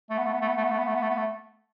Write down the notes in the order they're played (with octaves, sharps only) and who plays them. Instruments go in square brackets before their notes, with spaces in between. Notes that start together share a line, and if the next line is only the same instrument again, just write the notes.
[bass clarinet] A3
B3
A3
B3
A3
B3
A3
B3
A3
B3
A3
B3
A3
B3
A3